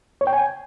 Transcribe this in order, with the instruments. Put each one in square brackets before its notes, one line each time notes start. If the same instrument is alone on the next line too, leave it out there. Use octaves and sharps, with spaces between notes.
[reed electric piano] C#5
G5
G#5